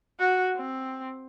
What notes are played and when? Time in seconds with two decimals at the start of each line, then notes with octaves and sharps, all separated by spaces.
0.19 F#4
0.56 C4